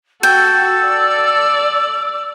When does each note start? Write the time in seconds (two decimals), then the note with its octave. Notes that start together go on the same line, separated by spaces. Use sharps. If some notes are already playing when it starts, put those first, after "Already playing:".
0.23 F#4 A4 G5 E6
0.88 D5